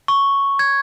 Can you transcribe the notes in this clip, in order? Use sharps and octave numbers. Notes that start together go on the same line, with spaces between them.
C#6
G#6